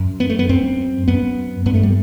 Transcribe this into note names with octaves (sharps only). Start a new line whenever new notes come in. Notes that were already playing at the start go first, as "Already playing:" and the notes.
Already playing: F#2
B3
A3
B3
F#2 C4
F#2 B3
G2 B3
A3
G3